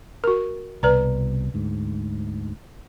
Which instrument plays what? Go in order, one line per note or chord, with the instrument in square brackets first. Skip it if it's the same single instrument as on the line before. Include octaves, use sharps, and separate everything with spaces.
[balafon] F#4 A#4
[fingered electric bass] C2 B2 [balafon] B4 D5 A#5
[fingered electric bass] D2 G#2